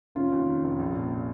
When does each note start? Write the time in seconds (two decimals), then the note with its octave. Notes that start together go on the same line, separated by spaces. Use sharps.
0.15 F1 C#4 F4
0.32 D#2
0.48 D#3
0.64 F1
0.79 A#1
0.96 A#2